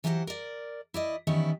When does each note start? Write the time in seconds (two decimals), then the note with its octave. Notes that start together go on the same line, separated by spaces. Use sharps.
0.04 E3 F#3 G4 C5 C#5 F#5
0.27 A#4 D5
0.94 E4 D5 D#5
1.27 D#3 E3 G3 B3 C#4 E4